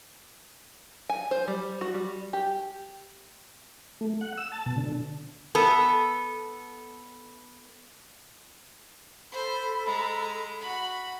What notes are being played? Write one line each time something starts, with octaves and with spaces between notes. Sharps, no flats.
G#5
C5
G3
F#4
G3
G4
A3
F#5
E6
A5
B2
D3
B3 A4
A4 C5 B5
G#3 A#5
F#4 B5